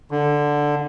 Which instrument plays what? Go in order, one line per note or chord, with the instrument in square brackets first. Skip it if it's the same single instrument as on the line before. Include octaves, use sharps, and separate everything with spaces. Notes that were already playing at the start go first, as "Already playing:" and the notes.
[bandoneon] D3